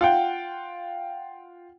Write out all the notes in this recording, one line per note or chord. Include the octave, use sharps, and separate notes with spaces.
F4 F#5 G5